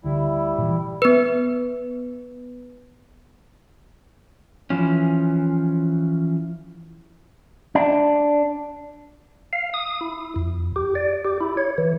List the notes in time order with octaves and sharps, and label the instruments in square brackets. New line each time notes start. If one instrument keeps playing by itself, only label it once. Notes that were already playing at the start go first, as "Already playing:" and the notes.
[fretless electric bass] D2 D3 [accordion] G3 E4
[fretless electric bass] A#2 E3
[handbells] B3 B4
[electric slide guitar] E3 F3 C#4
[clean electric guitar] D4
[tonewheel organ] F5
D#6
E4
F2
G4
D5
G4
E4
C#5
E3